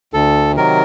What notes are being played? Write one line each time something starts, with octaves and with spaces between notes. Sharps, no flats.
D2 A4
C3 D#3 F#3 A#4